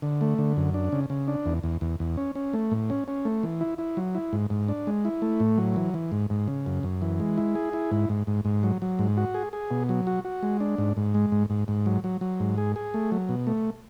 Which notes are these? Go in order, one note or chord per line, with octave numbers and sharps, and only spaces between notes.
D3
A3
D3
F#2
D4
C#3
C#3
D4
E2
E2
E2
E2
C#4
C#4
A3
A2
C#4
C#4
A3
E3
E4
E4
F#3
E4
G#2
G#2
D4
G#3
E4
A3
A2
F#3
E3
E3
G#2
G#2
C#3
F#2
F#2
E3
G#3
E4
G#4
E4
G#2
G#2
G#2
G#2
F#3
F#3
G#2
F#4
G#4
G#4
B2
F#3
F#4
F#4
G#3
D4
G#2
G#2
G#3
G#2
G#2
G#2
F#3
F#3
F#3
G#2
G#4
G#4
A3
F#3
B2
A3